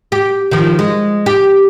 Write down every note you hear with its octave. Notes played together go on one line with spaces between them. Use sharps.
G4
D#3 F3
G#3
G4